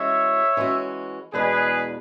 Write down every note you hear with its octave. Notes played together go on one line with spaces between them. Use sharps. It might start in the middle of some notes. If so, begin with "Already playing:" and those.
Already playing: E3 G#3 C#4 F#4 C#5 E5
E3 G#3 C#4 F#4
E2 B2 G#3 B3 D4 G#4 B4